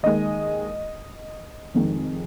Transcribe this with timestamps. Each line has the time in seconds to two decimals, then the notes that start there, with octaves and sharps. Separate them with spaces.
0.03 D#2 D#3 G#3 D#5
1.75 F1 F2 D#3 G#3